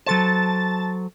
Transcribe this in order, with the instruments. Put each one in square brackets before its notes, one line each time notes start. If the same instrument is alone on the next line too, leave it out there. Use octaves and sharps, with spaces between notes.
[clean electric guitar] F#3 A4 C5 [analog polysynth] A5 A6